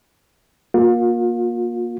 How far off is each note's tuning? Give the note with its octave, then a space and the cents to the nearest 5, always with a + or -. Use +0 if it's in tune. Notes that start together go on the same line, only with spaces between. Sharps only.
A#3 +15 F4 +35